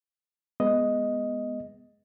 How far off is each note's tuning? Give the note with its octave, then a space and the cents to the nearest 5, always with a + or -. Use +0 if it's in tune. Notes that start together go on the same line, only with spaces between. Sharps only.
G#3 +0 B3 +0 D#5 +5